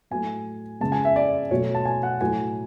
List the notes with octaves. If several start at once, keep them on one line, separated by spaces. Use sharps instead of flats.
A2 F#3 A3 G#5
C#3 G#3 A5
G#5
E5
D5
B2 F#3 A3 C#5
A5
G#5
F#5
A2 F#3 A3 G#5